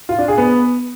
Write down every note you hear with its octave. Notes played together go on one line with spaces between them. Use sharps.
F4
D4
G#4
B3